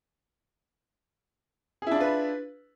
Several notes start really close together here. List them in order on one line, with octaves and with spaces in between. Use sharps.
G#4 E4 D4 F4 B4